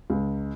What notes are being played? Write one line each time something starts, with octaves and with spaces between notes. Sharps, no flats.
C#2